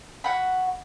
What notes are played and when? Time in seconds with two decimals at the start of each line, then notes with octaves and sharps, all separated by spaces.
0.24 F#4 F#5 B5